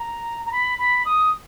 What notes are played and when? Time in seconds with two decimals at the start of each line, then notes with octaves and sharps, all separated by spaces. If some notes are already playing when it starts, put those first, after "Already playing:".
Already playing: A#5
0.46 A#5
0.52 B5
0.79 B5
1.05 D#6